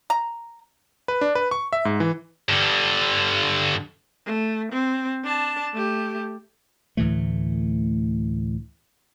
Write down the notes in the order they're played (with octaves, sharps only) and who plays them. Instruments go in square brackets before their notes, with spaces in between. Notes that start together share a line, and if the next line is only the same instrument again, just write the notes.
[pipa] A#5
[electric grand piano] B4
D4
B4
C#6
E5
G#2
E3
[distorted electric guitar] G2 D3
[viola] A3
C4
D4 A5
A3 G4
[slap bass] D2 A2 E3 A3